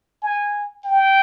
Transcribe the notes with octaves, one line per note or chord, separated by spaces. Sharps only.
G#5
G5